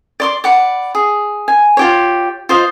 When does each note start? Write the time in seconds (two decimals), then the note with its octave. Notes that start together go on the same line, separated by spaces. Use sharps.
0.20 D5 C6 D6
0.44 D5 F#5 B5
0.95 G#4
1.48 G#5
1.77 F4 G4 C#5
2.49 F4 C5 D#5